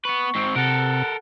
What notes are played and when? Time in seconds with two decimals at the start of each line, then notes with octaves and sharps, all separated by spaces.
0.05 B3 B4 C#6
0.35 G#2 C4
0.56 C3 A4 A#4 F#5